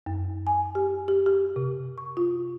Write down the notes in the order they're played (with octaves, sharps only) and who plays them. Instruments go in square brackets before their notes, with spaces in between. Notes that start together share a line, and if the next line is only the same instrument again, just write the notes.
[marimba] F#2
G#5
G4
G4
G4
C3
C#6
F4